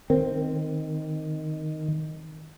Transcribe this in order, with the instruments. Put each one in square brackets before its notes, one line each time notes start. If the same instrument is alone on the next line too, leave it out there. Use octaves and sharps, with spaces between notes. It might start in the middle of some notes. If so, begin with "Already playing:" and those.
[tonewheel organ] D#3 [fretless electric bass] C4